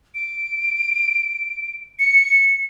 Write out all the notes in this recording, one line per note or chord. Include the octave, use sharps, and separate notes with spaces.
D7
C#7